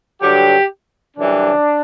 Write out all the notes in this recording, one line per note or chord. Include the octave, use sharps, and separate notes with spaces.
G2 D3 F#3 G4
F#2 C#3 E3 G3 D4